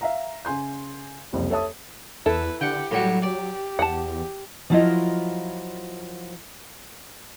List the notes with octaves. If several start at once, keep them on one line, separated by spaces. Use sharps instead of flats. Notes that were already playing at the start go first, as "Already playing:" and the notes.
E5 F5 A#5
C#3 G#5 C6 G6
F#1 C2 F2
A4 C#5 E5 A5 D#6
E2 E4 A4 B4
D3 G4 F#5 G5
A2 F#3 G3 F#4
G4 D5
E2 F#5 G5 A5
F3 F#3 E4 F4 A#4 D#5